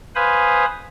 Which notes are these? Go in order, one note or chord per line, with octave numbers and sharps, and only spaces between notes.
B4 C5 F5 G#5 B5 D#6